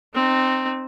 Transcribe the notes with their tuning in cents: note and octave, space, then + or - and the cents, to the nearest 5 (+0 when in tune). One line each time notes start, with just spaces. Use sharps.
C4 +0 D#4 -25